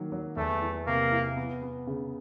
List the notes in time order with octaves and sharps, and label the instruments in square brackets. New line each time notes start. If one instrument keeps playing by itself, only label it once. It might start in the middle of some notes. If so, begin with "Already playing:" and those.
Already playing: [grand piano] D#3 F#3 A#3
F#3
[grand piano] E2 [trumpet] A3
[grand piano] E3
[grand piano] C3 [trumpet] A#3
[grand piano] E3
B3
B3
C#3